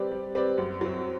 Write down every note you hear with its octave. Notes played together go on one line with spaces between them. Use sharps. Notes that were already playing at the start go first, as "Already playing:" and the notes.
Already playing: G3 C4 G4 B4 D5
G3
C4 G4 B4 D5
F#2
F#3 C4